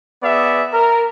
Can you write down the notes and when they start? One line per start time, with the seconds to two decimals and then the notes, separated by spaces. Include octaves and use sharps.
0.23 B3 G#4 D5 E5
0.73 A#4